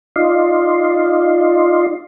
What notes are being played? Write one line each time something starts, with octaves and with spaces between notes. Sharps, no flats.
D#4 F4 D5 D#5 F5 C6